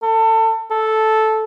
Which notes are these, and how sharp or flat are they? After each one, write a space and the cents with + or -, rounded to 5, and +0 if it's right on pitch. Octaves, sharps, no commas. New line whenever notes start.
A4 +25
A4 -10